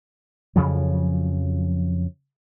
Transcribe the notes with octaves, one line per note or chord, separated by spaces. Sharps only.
F2 C#3 F3 F#3